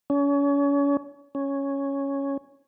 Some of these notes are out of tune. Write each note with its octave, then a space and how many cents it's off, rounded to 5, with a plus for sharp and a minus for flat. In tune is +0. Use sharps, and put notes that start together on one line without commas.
C#4 +35
C#4 +0